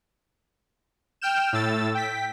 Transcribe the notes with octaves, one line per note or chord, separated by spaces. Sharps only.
G5 F6 G6 E7
A2 E6 A6
G5 B6